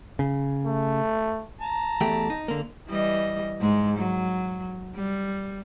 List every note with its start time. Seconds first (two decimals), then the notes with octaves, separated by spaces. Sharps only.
0.19 C#3
0.65 A3
1.61 A5 A#5
2.01 E2 A3 G4
2.30 D#4
2.48 D3 A#3
2.89 E3 G3 D#5
3.61 G#2 G#3
3.98 F#3
4.95 G3